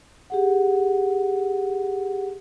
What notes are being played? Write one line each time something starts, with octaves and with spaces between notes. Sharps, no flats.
G4 G#4 F#5